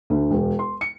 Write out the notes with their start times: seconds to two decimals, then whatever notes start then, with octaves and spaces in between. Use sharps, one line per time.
0.10 D2
0.31 E1
0.59 C6
0.81 C#7